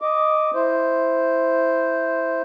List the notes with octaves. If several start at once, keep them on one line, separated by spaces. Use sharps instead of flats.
D#5 D6
E4 C5